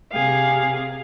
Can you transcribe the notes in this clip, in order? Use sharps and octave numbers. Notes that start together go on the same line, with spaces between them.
C3 G#4 F5